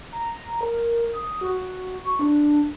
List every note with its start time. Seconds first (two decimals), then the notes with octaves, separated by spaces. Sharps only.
0.12 A#5
0.61 A#4
1.13 D#6
1.41 F#4
2.05 C#6
2.19 D4